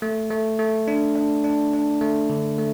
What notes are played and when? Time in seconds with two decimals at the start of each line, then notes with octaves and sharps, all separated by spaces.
0.02 A3
0.30 A3
0.59 A3
0.88 D4
1.16 D4
1.44 D4
1.73 D4
2.01 A3
2.30 D3
2.58 A3